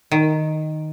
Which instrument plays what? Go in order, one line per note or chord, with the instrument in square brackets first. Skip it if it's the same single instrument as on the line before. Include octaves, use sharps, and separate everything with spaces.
[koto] D#3